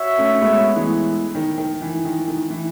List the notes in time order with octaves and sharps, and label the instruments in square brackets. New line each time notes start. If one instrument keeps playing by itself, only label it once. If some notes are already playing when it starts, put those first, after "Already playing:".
Already playing: [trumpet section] F#4 C#5 E5
[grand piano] A3 C#4
G#3 B3
E3 G#3
D#3
D#3
E3
D#3
D#3
E3